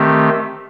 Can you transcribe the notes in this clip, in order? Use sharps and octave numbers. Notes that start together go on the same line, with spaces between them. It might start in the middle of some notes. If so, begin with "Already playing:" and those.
Already playing: D#3 A3 C4 G4